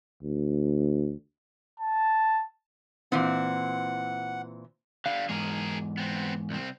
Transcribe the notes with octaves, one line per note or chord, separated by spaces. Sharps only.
D2
A5
A#2 E3 C4 F#5
D3 G3 F5
E2 G#2 G#4 A#4
B3 C4
C2 C4